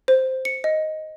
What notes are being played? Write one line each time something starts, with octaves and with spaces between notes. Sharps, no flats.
C5
C#7
D#5